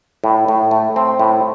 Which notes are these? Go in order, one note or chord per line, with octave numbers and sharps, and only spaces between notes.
A2
A2
A3
C4
A2